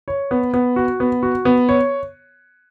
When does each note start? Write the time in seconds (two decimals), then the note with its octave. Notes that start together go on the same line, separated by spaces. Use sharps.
0.08 C#5
0.31 B3
0.54 B3
0.76 F#4
1.00 B3
1.23 F#4
1.45 B3
1.69 C#5